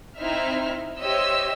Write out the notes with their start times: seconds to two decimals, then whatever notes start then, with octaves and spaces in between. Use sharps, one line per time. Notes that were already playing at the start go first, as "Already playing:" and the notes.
0.18 C4 D#4 E4 C5 E5 F6
0.98 G4 C5 C#5 D#5 E5 E6